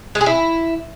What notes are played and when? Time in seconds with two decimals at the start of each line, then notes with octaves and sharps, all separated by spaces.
0.15 G#3
0.21 G#4
0.26 E4